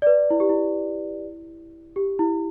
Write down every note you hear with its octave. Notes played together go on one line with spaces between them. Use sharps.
D5
B4
E4
G4
E4
G4
E4